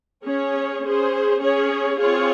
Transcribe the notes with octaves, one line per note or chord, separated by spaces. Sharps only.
C#4 G#4 C#5
C#4 G#4 C5
C#4 G#4 C#5
C4 F4 G#4 C#5